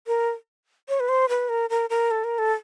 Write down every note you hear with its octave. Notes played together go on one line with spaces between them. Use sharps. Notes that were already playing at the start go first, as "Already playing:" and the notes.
A#4
C#5
B4
C5
B4
A#4
A#4
A#4
A4
A#4
A4